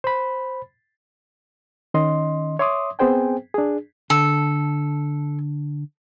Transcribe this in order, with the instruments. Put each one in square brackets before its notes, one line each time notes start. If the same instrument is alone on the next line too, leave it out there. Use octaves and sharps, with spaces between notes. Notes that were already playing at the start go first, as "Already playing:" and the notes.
[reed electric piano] C5 B5
D#3 C#4 D#5 C6
C#5 E5 C6 D6 D#6
B3 C4 G#4 C5 G5 G#5
D4 G#4
[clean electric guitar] D3 [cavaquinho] A4